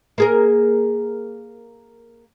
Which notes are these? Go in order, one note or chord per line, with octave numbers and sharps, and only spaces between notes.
A#3 G#4 A#4